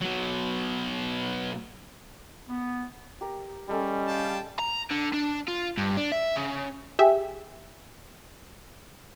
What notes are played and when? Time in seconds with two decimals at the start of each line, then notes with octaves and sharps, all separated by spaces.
0.02 B2 F#3
2.49 B3
3.21 G4 A#4
3.69 G3 G#3 C#4 A4 G#5
4.08 F5 G5 A5
4.59 A#5
4.91 D3
5.13 D4
5.48 F4
5.78 G2
5.97 D4
6.12 E5
6.36 C#3
6.99 G4 G#4 E5